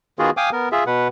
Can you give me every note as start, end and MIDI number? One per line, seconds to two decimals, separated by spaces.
0.19 0.30 51
0.19 0.30 59
0.19 0.30 65
0.19 0.30 66
0.19 0.30 68
0.37 0.50 77
0.37 0.50 79
0.37 0.50 80
0.37 0.50 86
0.37 0.50 87
0.53 0.69 59
0.53 0.69 70
0.72 0.84 65
0.72 0.84 68
0.72 0.84 76
0.87 1.08 47
0.87 1.08 71
0.87 1.08 78